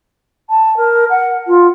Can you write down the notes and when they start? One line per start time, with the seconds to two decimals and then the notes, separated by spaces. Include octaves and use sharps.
0.50 A5
0.77 A#4
1.10 F#5
1.47 F4